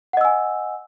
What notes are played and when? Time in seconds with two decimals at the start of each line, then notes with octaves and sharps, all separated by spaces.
0.13 F#5
0.17 D#5
0.21 E6
0.25 G#5